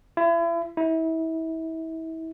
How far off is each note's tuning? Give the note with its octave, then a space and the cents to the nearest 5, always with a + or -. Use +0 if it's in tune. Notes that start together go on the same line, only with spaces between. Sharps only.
E4 +40
E4 -30